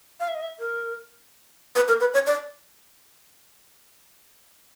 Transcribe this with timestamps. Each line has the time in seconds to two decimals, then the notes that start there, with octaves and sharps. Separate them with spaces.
0.20 F5
0.28 E5
0.35 D#5
0.42 E5
0.59 A#4
1.76 B4
1.88 A#4
2.01 B4
2.14 C#5
2.27 D5